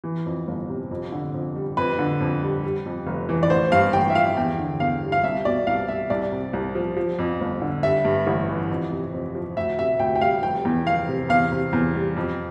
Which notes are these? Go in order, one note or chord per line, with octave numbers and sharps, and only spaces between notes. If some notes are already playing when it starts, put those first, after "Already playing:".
E3
F2
G1
C3
F2
D3
F2
G3
F2 B4
D3
F2
G3
G3
F2
F1
E3
D5
A1 C5
G2 F5
A1 G5
E5
F3 F5
E2 G5
D3
E2 F5
G3
F5
C2 E5
B2 D5
C2 F5
G3 E5
C2 D5
C3
C2
F3
F3
F2
G1
D3
G3 E5
G2
A1
E3
F2
C3
F2
F3
D2 E5
C3 E5
D2 G5
G5
G3 F5
F1 G5
E2
F1 F5
C3
E2 F5
C3
E2
G3
F2